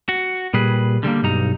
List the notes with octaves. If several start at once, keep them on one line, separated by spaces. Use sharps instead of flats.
F#4
A#2 G3 G#4 B4
D3 G3 G#3 A#3
B1 G2 D#4 A#5